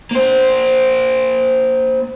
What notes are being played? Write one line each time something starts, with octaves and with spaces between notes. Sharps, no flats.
A#3 C5